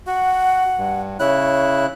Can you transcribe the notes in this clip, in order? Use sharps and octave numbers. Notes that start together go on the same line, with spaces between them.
F#4 F#5
G2
C#3 E4 C#5 F#6